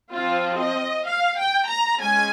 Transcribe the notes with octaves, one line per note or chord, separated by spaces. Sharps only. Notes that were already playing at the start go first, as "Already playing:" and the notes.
F3 C4 F4
D#5
F5
G5
A#5
G#3 C#4 G#5